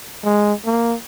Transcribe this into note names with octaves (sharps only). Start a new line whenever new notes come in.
G#3
A#3